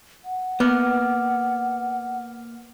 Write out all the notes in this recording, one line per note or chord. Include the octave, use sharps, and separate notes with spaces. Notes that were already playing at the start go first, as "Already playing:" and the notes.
F#5
A#3 B3 D6 F6